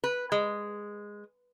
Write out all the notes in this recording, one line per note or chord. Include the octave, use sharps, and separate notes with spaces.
B4
G#3